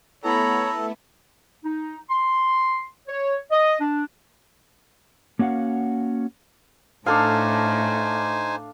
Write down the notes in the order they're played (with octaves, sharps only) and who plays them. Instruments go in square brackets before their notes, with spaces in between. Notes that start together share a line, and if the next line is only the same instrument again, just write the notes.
[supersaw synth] A3 B3 E4 [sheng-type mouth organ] A4 [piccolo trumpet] C#5 [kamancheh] A#5 B5
[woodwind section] D#4
C6
C#5
D#5
D4
[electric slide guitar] A#3 C#4 F#4 F5 F#5
[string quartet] A2 A3 [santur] D4 A4 F5 [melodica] D#4 C5 G#5